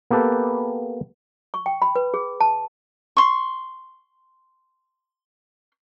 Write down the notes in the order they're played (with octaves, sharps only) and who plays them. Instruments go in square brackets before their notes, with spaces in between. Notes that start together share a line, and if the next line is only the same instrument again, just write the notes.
[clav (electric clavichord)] A#3 B3 G4 A4 B4
[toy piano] C#6
G5
B5
B4
G#4
A5
[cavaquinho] C6 C#6